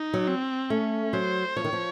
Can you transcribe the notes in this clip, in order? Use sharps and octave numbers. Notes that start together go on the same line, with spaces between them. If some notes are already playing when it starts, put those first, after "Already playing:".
Already playing: D#4
F#3
C4
A3 C#4
F#3 C5
F3 C#5
D#3
F3